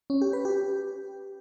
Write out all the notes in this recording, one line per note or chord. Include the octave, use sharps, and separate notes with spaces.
C#4
G4
B4
G4